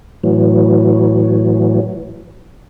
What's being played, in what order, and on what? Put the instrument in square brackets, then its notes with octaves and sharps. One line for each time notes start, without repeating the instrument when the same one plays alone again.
[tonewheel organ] A2 E3 F#3